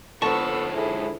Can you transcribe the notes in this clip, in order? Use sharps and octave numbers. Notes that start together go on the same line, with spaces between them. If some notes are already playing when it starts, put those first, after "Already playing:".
G#2 D3 F3 B3 A4 A5 C#6 E6
E4 G#4